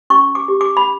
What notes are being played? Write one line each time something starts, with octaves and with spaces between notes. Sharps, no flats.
C#4 C#6
D6
G4
D6
B5